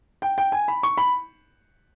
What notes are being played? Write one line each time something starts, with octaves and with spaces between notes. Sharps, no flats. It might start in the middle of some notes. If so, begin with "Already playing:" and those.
G5
G5
G#5
B5
C#6
B5